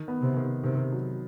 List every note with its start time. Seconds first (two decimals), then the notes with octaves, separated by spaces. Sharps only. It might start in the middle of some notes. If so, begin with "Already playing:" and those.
Already playing: D#3
0.08 B3
0.22 C3
0.37 D#3
0.64 C3 D#3
0.92 F#3